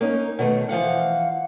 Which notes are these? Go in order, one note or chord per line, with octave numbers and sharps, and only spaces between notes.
A#3 C#4 D#4
B2 D#3 A3
E3 F3 F5 F#5